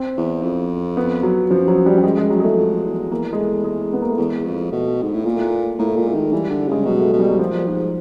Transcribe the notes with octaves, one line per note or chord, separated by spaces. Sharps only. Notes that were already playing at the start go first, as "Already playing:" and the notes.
Already playing: C4
E2
F2
B3
F#3
F#2 F3
F#3
G3
G3
G#3
G#3
F#3
G#3
E2 A3
F2
E2
E2 A#3
G#3
A3
G#3
B3
A#3
A3
E2 G#3
F2
B2 A3
G#2
A2
A#2 A#3
A3
A#3
A2 A#3
A3
A#2 G#3
A3
D#3
E3 G3
D3
C#3 G#3
G3
B2 F#3
A3
B2 G#3
G3
F#3
A#2 F3
G#2